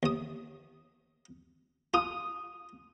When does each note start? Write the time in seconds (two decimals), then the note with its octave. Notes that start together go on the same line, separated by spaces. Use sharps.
0.03 D#2 D#6
1.94 F4 D#6